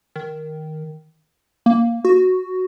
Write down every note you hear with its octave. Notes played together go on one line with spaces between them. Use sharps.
D#3
A#3
F#4